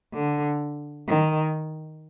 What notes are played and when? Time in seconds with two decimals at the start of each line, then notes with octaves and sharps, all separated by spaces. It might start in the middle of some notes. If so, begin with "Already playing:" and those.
0.14 D3
1.08 D#3